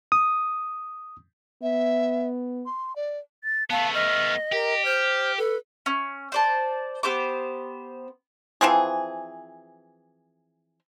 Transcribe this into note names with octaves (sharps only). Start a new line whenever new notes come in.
D#6
B3 E5
C6
D5
A6
A3 B3 F5 A5
D#5 F6
G4 A#4
C5 F6
A4 B4
C#4
C5 D5 A5
B3 G4 C5 D6
E3 F3 C4 G#4